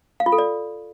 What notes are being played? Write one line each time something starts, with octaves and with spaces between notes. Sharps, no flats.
F5
F4
A4
D5